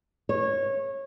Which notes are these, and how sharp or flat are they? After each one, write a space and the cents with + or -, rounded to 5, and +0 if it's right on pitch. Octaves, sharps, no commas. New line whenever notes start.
C#5 -20